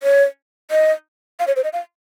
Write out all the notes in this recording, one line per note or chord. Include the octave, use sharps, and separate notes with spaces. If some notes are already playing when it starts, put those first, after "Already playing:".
C#5
D#5
F5
C#5
C5
D#5
F5